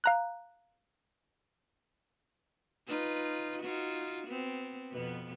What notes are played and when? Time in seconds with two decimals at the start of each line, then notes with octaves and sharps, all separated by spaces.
0.04 F5 A#5 F#6
2.88 D#4 F4 B4
3.62 D#4 F4 F#4
4.27 B3 C4
4.92 F2 B2 B3